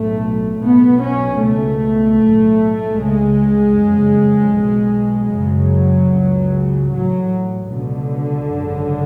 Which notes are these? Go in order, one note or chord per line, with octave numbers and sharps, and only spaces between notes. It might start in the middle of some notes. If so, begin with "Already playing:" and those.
Already playing: B1 A2 A3
B1 B2 B3
C#4
C#2 B2 A3
B1 A2
C#2 C#3 G#3
F#1 F2 C#3
B1 B2
F#1 F#2 C#3 F#3
C#2 C#3
A1 A2 F#3
C#2 B2 D3
G#1 F#2 C#3